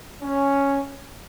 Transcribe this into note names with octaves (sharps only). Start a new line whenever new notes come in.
C#4